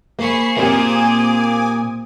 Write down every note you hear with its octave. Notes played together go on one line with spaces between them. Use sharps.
A#3 G#4 C5 B5 C#6 C7
A#2 A#3 C4 G4 G#5 D6 D#6